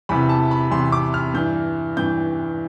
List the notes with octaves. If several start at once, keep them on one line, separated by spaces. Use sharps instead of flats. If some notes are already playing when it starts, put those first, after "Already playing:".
E2 C3 E3 B5
A5
B5
E2 C3 E3 C6
D6
F6
G2 E3 G6
G2 E3 G6